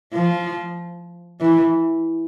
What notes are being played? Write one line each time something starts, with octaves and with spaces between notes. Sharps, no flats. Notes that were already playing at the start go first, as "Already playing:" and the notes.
F3
E3